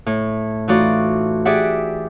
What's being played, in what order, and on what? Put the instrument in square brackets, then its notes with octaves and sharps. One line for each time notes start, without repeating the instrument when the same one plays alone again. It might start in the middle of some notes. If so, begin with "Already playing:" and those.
[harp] A2
E3 A3 D#4 F4 F#4 D5
G4 G#4 D5 E5 F#5